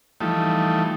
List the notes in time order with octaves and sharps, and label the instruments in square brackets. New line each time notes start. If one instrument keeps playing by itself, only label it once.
[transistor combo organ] E3 F3 G3 A3 D#4